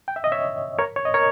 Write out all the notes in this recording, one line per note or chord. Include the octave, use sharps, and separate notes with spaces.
G5
E5
D#5
C#5 E5
A#4 C#5
C#5
D#5
A#4 C#5